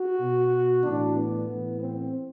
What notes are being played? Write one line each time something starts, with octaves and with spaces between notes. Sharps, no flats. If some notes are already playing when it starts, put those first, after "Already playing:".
Already playing: F#4
B2
A2 E3 D4
B3
A2 E3
C4